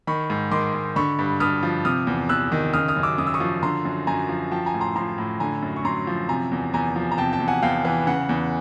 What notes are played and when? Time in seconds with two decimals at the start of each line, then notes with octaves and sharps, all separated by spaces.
0.07 D#3 B5 C#6
0.30 G#2
0.51 D#3 C6 D6
0.74 G#2
0.96 D3 B5 C#6
1.19 G2
1.40 G2 D#6 F6
1.63 F3
1.85 C3 D#6 F6
2.07 E2
2.29 E2 E6 F#6
2.52 D#3
2.73 C#3 D#6 F6
2.88 D#6 F6
2.96 F#2
3.03 D6 E6
3.18 F#2 D#6
3.27 E6
3.34 C#6 D#6
3.40 F3
3.63 D3 A#5 C6
3.85 F#2
4.07 F#2 G#5 A#5
4.29 F3
4.51 F3 G5 A5
4.66 G#5 A#5
4.74 A2
4.81 A#5 C6
4.96 F3 A#5 C6
5.18 A2
5.40 D3 G#5 A#5
5.62 F#2
5.76 C#6
5.84 F#2 A#5 C6
6.07 F3
6.29 C3 G#5 A#5
6.52 E2
6.73 E2 G#5 A#5
6.96 F3
7.12 A#5
7.18 C3 G5 A5
7.33 G5 A5
7.40 E2
7.48 F#5 G#5
7.62 E2 F5 G5
7.85 E3
8.07 C#3 F#5
8.29 E2